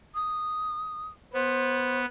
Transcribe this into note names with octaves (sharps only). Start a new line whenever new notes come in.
D#6
B3 C5